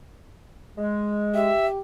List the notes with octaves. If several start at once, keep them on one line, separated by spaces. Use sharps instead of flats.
G#3
G4 E5